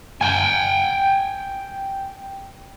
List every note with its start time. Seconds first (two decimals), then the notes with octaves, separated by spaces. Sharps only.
0.21 G5 G#5